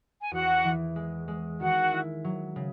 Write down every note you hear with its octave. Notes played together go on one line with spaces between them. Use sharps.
G#5
E2 F#4 F#5
E3
G#3
G#3
D#3 F#4 F#5
E4
F#3
C#3